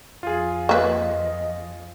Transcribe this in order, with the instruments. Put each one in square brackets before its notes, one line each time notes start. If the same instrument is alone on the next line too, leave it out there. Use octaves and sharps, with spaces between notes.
[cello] F2 [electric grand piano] F4 G#4
[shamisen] A#3 B4 [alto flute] D#5